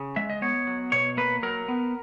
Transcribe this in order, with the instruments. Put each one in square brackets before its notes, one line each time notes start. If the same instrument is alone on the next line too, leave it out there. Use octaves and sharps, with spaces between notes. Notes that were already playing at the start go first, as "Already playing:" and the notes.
Already playing: [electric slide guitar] C#3
G#3 E5
D#5
B3 C#5
F#3
B2 C#5
A#3 B4
F#3 A#4
B3